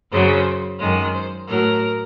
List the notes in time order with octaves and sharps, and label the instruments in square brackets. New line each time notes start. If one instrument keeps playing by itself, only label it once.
[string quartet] F#2 C#3 F#3 C5
F#2 D#3 G#3
C5
A2 F#3 A#4